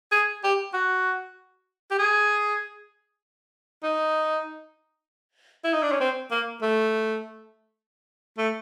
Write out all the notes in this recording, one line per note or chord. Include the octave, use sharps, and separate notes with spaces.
G#4
G4
F#4
G4
G#4
D#4
E4
D#4
D4
C#4
C4
A#3
A3
A3